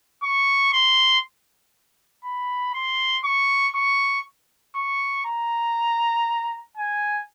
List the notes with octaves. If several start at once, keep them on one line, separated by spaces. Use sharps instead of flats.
C#6
C6
B5
C6
C#6
C#6
C#6
A#5
G#5